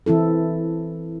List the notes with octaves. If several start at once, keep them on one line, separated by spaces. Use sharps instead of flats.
E3 C4 E4 A4